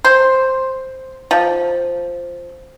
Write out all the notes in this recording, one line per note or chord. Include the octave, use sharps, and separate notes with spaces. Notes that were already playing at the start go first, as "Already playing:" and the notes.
C5
F3